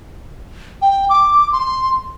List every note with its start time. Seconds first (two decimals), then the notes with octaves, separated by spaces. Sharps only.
0.82 G5
1.09 D6
1.53 C6